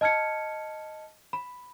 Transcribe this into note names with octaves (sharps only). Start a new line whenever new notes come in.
D#5 A5 F6 G#6 C#7
B5